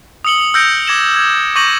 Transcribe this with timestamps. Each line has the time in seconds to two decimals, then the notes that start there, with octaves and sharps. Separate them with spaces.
0.25 D#6 E6 C#7 F#7 G7
0.54 E6 F6 G6 A#6 C#7 D7
0.87 D6 G#6 A#6 E7 G7
1.16 G#6
1.55 C#6 D6 G6 A#6 D#7 F#7